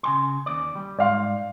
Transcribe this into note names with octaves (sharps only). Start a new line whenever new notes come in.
C#3 G#5 C6
D#2 D5
G3
G#2 D5 F5 C6